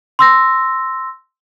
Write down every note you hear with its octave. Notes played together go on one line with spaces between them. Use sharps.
C6 E6 A#6